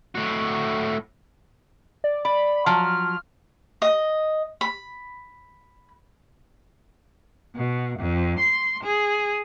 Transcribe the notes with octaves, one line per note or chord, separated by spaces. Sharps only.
A2 F#4
D5
D5 B5
F3 F#3 F6
D#5
B5
B2
F2
C6
G#4